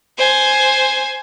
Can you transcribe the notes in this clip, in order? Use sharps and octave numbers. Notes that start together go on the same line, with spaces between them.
C5 G#5